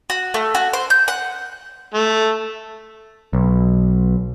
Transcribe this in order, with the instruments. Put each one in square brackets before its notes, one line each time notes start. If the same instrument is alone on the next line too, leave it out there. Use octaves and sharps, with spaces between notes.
[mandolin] F#4
A3
F#4
C5
G6
F#5
[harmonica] A3
[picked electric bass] B1